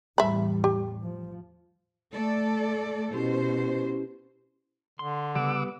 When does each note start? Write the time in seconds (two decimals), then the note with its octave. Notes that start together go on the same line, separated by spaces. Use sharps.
0.18 E2 A2 G3 E5 B5
0.64 G4
1.02 F3
2.13 A3 A4 D5
3.12 B2 C#4 E4 G4 C5
4.99 D3 C6
5.35 C#3 G3 B3 F#5 D6 E6